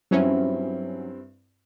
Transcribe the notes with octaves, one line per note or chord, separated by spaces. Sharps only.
G2 F#3 C4 C#4 E4